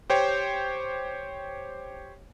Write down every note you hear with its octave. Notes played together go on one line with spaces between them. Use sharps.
G4 C5 C#5 G5